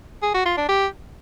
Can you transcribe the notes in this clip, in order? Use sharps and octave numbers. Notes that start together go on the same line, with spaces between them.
G#4
F#4
F4
D4
G4